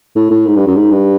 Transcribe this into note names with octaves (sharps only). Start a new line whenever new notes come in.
A2
A2
G#2
G2
F#2
G#2
G2